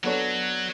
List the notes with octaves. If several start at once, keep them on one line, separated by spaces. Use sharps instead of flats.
F#3 B3 D4 A4 C#5